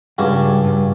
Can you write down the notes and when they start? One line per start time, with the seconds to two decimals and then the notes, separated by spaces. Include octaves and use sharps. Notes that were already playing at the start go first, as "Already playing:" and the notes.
0.18 C#2 G2 C#3 G3 D4 F#4
0.41 G2
0.64 G2